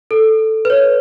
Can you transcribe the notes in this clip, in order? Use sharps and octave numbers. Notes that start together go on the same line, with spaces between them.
A4
B4
C#5